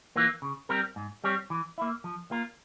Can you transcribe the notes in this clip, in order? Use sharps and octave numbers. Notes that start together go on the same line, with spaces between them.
E3 A#3 F4
C#3
G3 C4 G4 A#4
G#2
G3 C4 G4 C#5
E3
A#3 E4
F3
A#3 F4 A#4